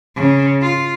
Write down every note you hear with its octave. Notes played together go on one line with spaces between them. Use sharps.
C#3
F4